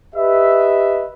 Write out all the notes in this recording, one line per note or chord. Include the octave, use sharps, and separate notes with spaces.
G4 B4 D#5 E5